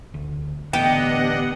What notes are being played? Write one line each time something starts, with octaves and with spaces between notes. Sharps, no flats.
D2
A1 D3 B3 D4 G4 D#5 F#5